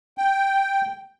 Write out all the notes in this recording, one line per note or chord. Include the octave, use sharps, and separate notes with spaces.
G5